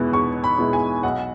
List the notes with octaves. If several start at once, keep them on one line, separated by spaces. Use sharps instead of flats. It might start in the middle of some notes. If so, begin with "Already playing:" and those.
Already playing: E2 B2 G#3 B3 E4
E2 C#6
B5
B2 G#3 B3 E4
G#5
B1 F#5